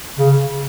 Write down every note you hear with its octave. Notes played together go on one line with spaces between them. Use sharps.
C#3